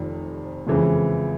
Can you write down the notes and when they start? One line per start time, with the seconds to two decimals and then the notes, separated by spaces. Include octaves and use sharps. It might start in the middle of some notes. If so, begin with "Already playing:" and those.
Already playing: F1 F2 C3 D#3
0.67 F#1 F2 C#3 E3 G#3